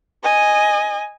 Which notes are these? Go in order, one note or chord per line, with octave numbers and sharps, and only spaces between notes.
D#5 G#5